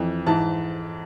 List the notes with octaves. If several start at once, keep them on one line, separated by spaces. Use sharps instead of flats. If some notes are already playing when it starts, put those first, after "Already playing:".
Already playing: F2 E3
G#2 E3 A5